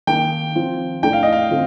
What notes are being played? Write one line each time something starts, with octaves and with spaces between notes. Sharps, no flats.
D#3 A#3 D#4 G5
F3 C4 F4
A2 A3 D4 G5
F5
D#5
F5
D3 A3 C4 F4